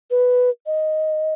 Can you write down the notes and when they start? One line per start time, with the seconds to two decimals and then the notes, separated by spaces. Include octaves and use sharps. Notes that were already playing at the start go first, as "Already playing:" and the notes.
0.11 B4
0.66 D#5